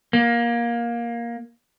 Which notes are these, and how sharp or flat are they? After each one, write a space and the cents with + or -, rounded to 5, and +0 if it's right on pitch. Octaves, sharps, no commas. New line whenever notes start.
A#3 +15